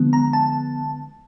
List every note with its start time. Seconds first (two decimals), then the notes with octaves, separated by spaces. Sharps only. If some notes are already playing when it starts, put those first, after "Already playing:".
Already playing: D3 F3 G#3 B3
0.13 A#5
0.33 A5